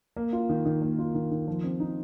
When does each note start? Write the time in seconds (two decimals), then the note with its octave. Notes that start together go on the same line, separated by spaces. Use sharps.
0.16 A#3
0.33 F4
0.49 D#3
0.66 D#3
0.82 A#3
0.99 F4
1.15 D#3
1.31 D#3
1.48 F3
1.64 C4
1.80 D#4